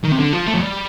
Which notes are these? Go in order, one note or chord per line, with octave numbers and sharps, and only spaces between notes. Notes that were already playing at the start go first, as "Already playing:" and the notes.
D#3
C3
D3
F3
A3
F3
G3